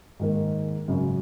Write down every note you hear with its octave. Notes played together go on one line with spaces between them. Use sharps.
G#2 D#3 A#3
G#1 F#2 C#3